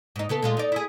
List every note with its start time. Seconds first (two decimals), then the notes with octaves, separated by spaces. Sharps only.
0.16 G#2 D#4
0.29 C#3 B3 A4
0.42 A#2 G#3 F4
0.57 D#4 D5
0.72 E4 G#4